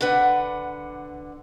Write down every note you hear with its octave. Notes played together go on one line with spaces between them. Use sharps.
D3 D4 B4 F#5